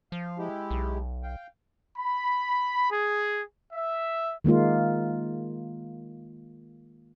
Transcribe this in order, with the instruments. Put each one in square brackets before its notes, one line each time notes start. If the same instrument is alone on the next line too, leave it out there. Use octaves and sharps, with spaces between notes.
[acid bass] F3 [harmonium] F5
[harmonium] G#3 E4 G4
[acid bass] B1
[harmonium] F5 G5
[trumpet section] B5
G#4
E5
[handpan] D#3 G#3 A#3 F4